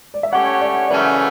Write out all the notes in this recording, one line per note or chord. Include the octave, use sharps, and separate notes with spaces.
D5
E5
A3 C#4 G4 C#5 F#5
D5
F#2 C#3 E3 A3 C#4 D5